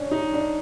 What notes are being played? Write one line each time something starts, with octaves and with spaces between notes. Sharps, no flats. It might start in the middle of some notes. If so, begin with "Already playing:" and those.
Already playing: C#4 D4
D#4
D4